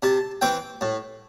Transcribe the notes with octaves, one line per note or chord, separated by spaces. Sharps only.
C3 A5
E3 C4 G5
A2